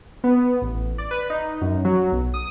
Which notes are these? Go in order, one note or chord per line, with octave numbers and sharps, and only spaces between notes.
B3
A1
D5
B4
D#4
F#2
F#3
B1
D#6